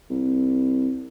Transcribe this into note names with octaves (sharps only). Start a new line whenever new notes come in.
C2